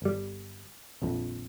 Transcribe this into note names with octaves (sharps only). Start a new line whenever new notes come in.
G1 G3
D#1 A#1 F2